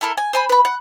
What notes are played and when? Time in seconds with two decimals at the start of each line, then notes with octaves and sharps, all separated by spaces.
0.01 A3 E4 A4 A#4
0.17 G#5
0.33 C5 G#5 B5
0.49 B4 B5
0.65 F#5